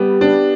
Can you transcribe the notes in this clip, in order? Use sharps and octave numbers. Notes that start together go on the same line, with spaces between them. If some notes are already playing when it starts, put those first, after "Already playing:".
Already playing: G3 B3 G4
D4